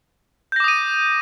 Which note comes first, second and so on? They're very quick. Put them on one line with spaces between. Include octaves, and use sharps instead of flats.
G6 A#6 D6 D#6 D#7